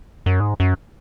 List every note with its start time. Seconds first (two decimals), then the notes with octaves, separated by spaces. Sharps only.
0.26 F#2
0.40 G#2
0.60 F#2